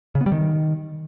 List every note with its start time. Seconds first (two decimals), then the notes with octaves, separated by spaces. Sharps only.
0.15 C#3
0.21 B3
0.26 G3
0.32 D#3